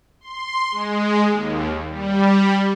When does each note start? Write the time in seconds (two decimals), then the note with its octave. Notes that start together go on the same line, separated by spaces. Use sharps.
0.21 C6
0.71 G#3
1.29 D#2
1.89 G3